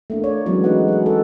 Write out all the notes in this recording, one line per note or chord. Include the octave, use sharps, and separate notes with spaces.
A3 A#3 D4
A3 C#5 D5
E3 F#3 G#3 A3 B3 C#4
C#4 D#4 F#4 B4 F#5
G#4 F#5
A4